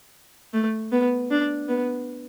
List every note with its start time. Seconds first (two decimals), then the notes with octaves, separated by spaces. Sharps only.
0.54 A3
0.92 B3
1.31 D4
1.68 B3